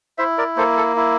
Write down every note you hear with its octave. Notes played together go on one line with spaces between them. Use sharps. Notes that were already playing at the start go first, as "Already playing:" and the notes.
E4 C5 E5
A#4 D5
A#3 A4 C5
A4
E4